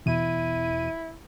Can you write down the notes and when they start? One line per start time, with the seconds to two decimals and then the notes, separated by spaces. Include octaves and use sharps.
0.06 E2 B2 E4 D#7